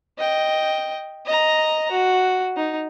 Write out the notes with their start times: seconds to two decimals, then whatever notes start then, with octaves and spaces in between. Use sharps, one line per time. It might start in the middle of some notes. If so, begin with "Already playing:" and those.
0.18 D#5 G5
1.26 D#5 A#5
1.91 F#4
2.56 D#4